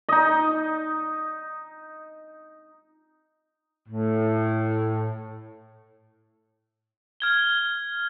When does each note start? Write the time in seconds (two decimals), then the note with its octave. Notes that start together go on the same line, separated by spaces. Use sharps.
0.09 D#4 D#5
3.89 A2
7.20 F6 G#6 G7